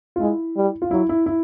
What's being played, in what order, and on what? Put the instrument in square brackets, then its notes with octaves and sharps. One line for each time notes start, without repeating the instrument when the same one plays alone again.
[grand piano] F4
[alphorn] G#3 [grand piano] E4
[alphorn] G3
[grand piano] F4
[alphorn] F#3 [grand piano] E4
[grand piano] E4
E4